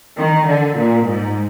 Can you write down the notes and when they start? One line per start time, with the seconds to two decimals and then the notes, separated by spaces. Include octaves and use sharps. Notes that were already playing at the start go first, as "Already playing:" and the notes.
0.18 D#3
0.48 D3
0.77 A#2
1.06 G#2